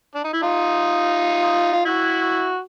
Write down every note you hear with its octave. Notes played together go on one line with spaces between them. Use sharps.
D4
D#4
E4
D#4 F4
F4
E4 F#4